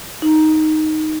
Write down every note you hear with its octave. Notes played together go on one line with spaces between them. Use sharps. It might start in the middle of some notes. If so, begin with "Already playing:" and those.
D#4